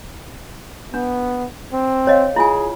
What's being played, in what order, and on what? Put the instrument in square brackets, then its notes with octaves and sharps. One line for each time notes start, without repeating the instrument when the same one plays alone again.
[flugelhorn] B3 [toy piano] D4
[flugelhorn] C4
[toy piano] C#5 D#5 F5
[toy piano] E4 F4 G#5 [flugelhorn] G#4